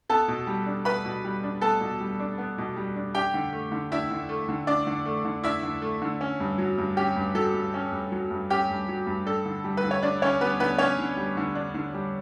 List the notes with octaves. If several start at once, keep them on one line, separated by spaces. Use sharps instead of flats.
B3 A4 A5
B2
G3
D4
B3 B4 B5
B2
G3
D4
B3 A4 A5
B2
G3
D4
B3
B2
G3
D4
D4 G4 G5
D3
A3
D3
D4 E4 E5
D3
A3
D3
D4 D5
D3
A3
D3
D4 E4 E5
D3
A3
D3
C#4
G2
F#3
G2
C#4 G4
G2
F#3 A4
G2
C#4
G2
F#3
G2
C#4 G4
G2
F#3
G2
D4 A4
D3
G3
B4
D3
C#5
D4 D5
D3 C#4 C#5
G3 B3 B4
D3 B3 B4
C#4 D4 C#5
D3
G3
D3
D4
D3
G3